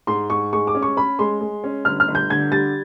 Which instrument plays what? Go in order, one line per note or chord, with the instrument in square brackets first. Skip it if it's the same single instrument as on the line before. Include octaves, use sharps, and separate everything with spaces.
[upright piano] G#2 C6
G#2 C#6
G#3 C#6
D6
C#4
C#6
C#4 B5
G#3 C6
G#3
C#4
G1 F6
F6
G1
G6
D3 G#6
G3 A6